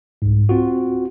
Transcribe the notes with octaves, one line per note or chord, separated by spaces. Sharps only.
C2 G#2
C4 F4 F#4